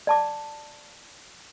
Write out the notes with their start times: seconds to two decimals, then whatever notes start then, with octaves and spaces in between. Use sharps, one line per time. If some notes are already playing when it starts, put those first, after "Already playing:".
0.07 D5 A5 D6